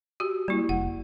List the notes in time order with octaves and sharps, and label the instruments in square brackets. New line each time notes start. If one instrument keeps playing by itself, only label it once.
[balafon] F#4 G4
[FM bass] G3 [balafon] A#3 E4
[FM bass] F1 [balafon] F#5